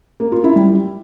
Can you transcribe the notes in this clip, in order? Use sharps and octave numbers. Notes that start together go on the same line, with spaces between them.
A#3
F4
E4
G3